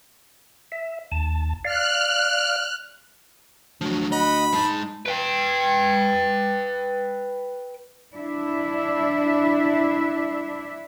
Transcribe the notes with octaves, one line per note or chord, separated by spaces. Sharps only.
E5
D#2 A5
D5 F5 F6 F#6
D2 F3 F#3
D#5 F#5 B5
G#3 D#4 A5
B4 G5
D4 E4 E5